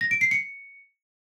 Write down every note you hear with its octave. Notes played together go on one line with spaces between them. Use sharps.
A#6
D7
C7
C#7